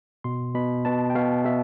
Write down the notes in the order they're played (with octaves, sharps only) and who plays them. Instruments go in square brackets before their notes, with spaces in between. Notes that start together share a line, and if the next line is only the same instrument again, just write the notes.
[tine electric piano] B2 C6
B2 B5
B2 A5
G5
B2 F5
B2 E5